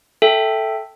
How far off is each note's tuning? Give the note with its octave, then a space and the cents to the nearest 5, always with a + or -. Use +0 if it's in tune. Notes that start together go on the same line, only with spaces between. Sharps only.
A4 +0 E5 +0 G5 +0